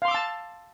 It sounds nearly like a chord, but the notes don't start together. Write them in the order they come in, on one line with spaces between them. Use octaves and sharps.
F5 C6 D6 E6 A5